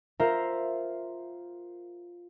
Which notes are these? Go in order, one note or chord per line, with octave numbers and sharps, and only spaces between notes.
F4 A#4 C5 E5 F5 A#5